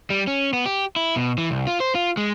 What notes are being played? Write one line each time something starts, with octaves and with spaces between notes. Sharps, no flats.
G3
C#4
B3
G4
E4
B2
E3
C2
F4
C5
F4
G#3